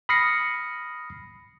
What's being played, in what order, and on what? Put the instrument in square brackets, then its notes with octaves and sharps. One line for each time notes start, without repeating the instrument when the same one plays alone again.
[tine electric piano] B5 D#6 F6 A#6 C7 C#7